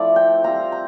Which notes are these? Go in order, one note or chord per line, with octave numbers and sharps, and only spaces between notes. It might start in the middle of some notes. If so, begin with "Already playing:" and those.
Already playing: F3 A3 C4 E4 D5
G5
G3 C4 F4 A#5
A#5